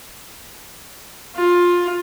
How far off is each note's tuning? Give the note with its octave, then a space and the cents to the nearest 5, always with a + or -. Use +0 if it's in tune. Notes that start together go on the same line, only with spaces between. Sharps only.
F4 +15